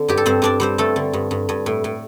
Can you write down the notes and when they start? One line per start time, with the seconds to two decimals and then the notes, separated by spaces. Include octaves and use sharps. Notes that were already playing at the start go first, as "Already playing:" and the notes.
Already playing: D3 C4
0.08 G2 G4
0.17 A4
0.26 G2 C4 C5
0.42 G2 D4 D5
0.60 G3 C4 C5
0.78 G2 A3 A4
0.96 D3
1.13 G2
1.31 G2
1.49 G2
1.66 A2
1.84 A2